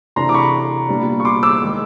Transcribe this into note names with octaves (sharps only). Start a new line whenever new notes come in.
C3 E3 A3 D4 A#5 C6
D6
B5 C#6
A#2 G3 B3 D4
C#6
C6 D6
D6 E6
D#3 G#3